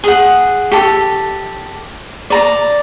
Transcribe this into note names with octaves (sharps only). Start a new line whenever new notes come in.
G#4 F#5
G4 A4
D5 A#5